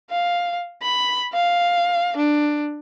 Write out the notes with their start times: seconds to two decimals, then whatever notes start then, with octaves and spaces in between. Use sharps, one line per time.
0.11 F5
0.82 B5
1.33 F5
2.17 D4